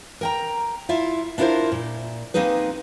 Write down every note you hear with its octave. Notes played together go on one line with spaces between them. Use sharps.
A#4 G5 A#5
E4 F4 E5
D4 E4 F4 A4 A#4 C5
A#2
A#3 C4 D#4 G#4 B4